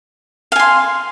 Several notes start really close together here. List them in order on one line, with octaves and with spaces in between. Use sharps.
F5 G#5 C6